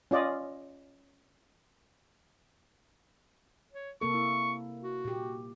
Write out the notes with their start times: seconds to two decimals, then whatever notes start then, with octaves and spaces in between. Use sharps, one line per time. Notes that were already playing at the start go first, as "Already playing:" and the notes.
0.11 C#4 F4 D5 D#5
3.73 C#5
4.01 C3 A#3 A4 C#6
4.14 E4
4.83 F#4
5.05 A#2 G4